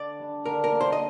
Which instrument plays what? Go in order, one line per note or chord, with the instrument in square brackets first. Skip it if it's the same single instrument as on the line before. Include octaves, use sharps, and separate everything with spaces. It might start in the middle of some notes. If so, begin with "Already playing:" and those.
Already playing: [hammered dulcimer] D3 [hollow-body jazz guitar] D5
[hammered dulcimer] G3 D4
[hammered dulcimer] D3 [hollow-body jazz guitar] A#4
[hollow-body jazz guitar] A#4
[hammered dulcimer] G3 A#3
[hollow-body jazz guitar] C5
D#5